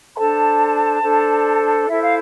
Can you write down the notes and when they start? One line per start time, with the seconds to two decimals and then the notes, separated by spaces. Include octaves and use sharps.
0.13 B5
0.17 D4 A4 C5 A5
1.02 D4 A4 C5
1.88 E4 A4 C5 E5
2.01 F5